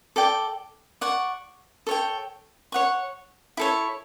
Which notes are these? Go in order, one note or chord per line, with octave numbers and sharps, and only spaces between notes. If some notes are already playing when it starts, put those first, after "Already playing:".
A4 D5 G5
D5 F#5 C#6
A4 C#5 G5
C#5 F#5 C#6
E4 A4 C#5